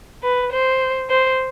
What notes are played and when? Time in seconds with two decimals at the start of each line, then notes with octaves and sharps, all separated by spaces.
0.23 B4
0.52 C5
1.10 C5